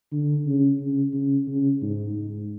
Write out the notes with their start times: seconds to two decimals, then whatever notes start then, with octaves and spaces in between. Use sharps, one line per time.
0.12 D3
0.46 C#3
0.80 C#3
1.13 C#3
1.47 C#3
1.82 G#2
2.15 G#2